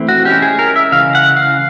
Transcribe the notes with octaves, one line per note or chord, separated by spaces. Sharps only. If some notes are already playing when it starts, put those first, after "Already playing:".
Already playing: E3 A3 C4 E4
F#4
G#3 C#4 E4 G4
G#4
A#4
E5
C#3 E3 G#3 F5
F#5
F5